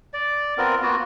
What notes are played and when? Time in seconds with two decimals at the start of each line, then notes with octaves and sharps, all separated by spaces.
0.14 D5
0.58 B3 C4 F4 A#4
0.82 A#3 B3 F4 F#4